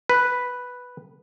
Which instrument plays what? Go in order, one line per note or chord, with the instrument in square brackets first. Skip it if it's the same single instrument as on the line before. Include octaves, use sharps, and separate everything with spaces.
[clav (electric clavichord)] B4